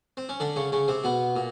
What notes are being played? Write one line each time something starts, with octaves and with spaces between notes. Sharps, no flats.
C4
C#4
D3 D4
C#3 C#4
C#3 C#4
C3 C4
B2 B3
A#2